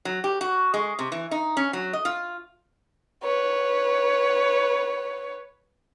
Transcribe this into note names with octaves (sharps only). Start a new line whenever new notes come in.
F#3
G4
F#4
G#3
C3
E3
D#4
C#4
F#3
D#5
F4
B4 C#5